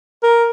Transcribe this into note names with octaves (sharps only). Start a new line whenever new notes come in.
A#4